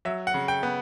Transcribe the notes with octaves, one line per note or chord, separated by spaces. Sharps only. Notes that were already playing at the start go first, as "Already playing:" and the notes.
F#3 E5
F#5
C#3
G5
B3